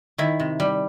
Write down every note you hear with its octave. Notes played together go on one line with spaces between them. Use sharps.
D#3 E4
C3
G3